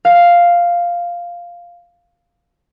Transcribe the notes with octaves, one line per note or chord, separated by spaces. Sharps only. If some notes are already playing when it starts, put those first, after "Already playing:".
F5